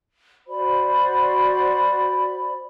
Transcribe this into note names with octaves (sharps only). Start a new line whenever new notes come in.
F#4 C5 D5 B5